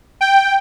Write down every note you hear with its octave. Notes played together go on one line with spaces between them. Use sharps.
G5